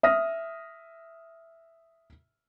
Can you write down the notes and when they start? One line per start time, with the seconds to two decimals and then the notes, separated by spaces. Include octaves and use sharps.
0.03 E5 D#6 F6 A#6